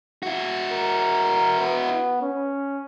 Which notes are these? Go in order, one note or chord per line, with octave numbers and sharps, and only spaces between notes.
E4 F#4
A#4
B3
C#4